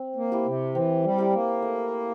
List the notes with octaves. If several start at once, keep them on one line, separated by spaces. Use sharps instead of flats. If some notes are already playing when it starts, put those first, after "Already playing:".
Already playing: C4
A#3
E4 G4
C3
E3 C4
G3
E4 G4 A#4
A#3
A3